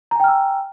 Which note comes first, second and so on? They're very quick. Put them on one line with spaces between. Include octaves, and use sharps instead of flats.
A#5 G#5 G5 F6 E6